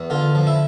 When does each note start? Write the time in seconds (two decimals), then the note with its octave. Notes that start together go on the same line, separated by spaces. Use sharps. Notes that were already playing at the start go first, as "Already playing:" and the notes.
Already playing: E2
0.10 D3 F4
0.35 F3
0.47 E4